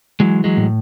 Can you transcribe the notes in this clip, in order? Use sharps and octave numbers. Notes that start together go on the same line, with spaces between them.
E3 F#3 G#3
F#3 G#3
A2